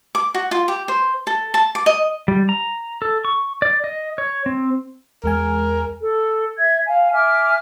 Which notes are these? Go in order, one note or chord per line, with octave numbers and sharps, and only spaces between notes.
D6
F#4
F4
G4
C5
A4
A5
D6
D#5
G3
A#5
A4
C#6
D5
D#5
C#5
C4
E2 G#3 A#4 G#5
A4
E5 G#6
F5 G#5
E5 G#5 D6 F6